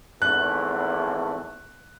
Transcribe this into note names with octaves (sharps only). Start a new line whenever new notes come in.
G#1 E2 A3 F#6